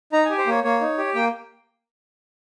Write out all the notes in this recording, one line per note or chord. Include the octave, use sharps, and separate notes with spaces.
D#4 A#5
G4 G#5
C5
A#3 C#5
A#3 C#5
D#4
G4
A#3 G5